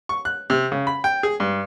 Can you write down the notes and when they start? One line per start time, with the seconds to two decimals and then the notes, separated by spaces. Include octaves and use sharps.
0.09 C#6
0.25 F#6
0.50 C3
0.72 C#3
0.87 B5
1.04 G5
1.23 G#4
1.40 G2